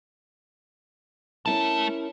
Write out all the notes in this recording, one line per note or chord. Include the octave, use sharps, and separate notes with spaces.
A3 C#4 E4 A#4 A5